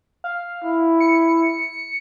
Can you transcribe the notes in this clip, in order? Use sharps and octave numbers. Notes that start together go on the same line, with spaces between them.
F5
E4
C#7